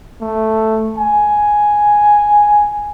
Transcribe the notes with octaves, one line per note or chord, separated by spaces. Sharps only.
A3
G#5